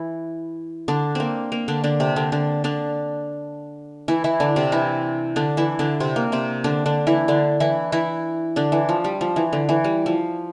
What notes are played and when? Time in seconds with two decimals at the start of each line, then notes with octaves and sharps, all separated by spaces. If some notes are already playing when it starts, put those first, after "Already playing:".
Already playing: E3 E4
0.88 D3 D4
1.15 A#3 C4
1.52 A#3
1.68 D3 D4
1.84 D3 D4
2.00 C3 C4
2.16 D3 D4
2.32 D3 D4
2.64 D3 D4
4.08 E3 E4
4.24 E3 E4
4.40 D3 D4
4.56 C3 C4
4.72 E3 E4
5.36 D3 D4
5.57 E3 E4
5.79 D3 D4
6.00 C3 C4
6.16 A#3
6.32 C3 C4
6.64 D3 D4
6.86 D3 D4
7.07 E3 E4
7.28 D3 D4
7.60 E3 E4
7.92 E3 E4
8.56 D3 D4
8.72 E3
8.89 F3
9.04 G3
9.21 F3
9.36 E3
9.53 D3
9.69 E3
9.84 G3
10.06 F3